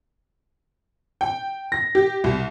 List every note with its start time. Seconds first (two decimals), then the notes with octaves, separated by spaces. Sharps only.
1.21 G5
1.72 A#6
1.95 G4
2.24 C2